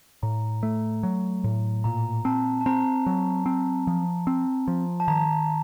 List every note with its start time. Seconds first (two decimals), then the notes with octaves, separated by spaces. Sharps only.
0.23 A2 A#5
0.63 A3
1.03 F#3
1.44 A2
1.84 A#2 A#5
2.25 C4 A5
2.61 A5
2.66 C4 A#5
3.06 F#3
3.46 C4
3.87 F3
4.27 C4
4.68 F3
5.00 A5
5.08 D#3 A#5